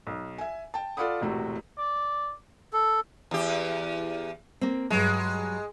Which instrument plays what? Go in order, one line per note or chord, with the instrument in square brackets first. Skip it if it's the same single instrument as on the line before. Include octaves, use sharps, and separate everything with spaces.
[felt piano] B1
E5 G#5
G5 A5
F4 A4 D5 F#5 B5 D#6
E1 A2 C3 F#4
[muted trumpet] D5
[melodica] A4
[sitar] E2 G4
[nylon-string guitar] A#3 C4
[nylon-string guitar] G2 F#3 [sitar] G#3